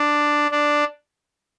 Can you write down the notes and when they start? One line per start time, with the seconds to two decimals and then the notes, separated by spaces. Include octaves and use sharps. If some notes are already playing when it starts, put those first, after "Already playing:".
Already playing: D4
0.51 D4